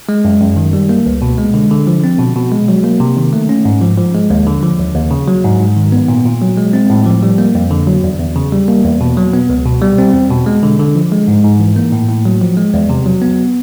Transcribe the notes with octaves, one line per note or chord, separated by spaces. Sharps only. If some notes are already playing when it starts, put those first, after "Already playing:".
G#3
F#2
F#2
D#3
G3
A#3
C#2
B2
G#3
D3
D3
F3
C4
B2
B2
G#3
F#3
A#3
C3
D#3
A3
C#4
G#2
F3
F3
G#3
D#2
D3
F3
D#2
D#2
C#3
F#3
G#2
G#2
D#3
B3
A#2
A#2
F#3
G#3
C4
A2
F3
G3
A#3
F2
D3
F#3
E2
E2
C#3
G3
A#3
E2
B2
F#3
B3
C#2
B2
G3
C4
E2
B2
G#3
D3
D3
F3
G#3
G#2
G#2
E3
A#3
A2
A2
F#3
F3
G#3
E2
C3
F#3
B3